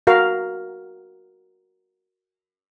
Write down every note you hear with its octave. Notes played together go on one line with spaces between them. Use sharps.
F#4 A#4 F5